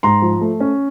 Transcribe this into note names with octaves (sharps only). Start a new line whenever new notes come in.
G#2 A#5 C6
F3
A3
C#4